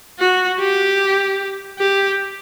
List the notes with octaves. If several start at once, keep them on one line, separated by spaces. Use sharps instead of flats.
F#4
G4
G4